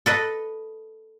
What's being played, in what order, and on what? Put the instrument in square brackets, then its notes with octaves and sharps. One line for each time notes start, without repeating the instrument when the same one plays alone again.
[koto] A4 B4 D#5